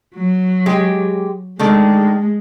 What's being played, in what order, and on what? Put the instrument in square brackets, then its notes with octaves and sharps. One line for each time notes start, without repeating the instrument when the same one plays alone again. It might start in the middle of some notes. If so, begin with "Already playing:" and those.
[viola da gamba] F#3
[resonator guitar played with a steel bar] G#3 G4
[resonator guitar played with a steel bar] D3 D#3 A3 [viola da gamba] G#3